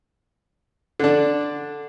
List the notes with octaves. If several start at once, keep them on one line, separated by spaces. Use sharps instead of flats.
D3 D4